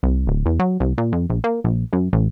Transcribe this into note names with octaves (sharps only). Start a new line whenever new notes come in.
C2
D1
E2
F#3
C2
A#2
F2
A#1
A#3
A#1
F#2
A1